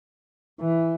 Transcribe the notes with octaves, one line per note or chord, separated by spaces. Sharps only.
E3